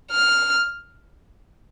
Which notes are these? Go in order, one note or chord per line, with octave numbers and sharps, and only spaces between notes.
F6